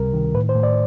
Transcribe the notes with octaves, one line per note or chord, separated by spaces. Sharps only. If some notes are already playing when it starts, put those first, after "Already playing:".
Already playing: C#2 C3 G3 A#4
D#3
A2 B4
C5
A2
D5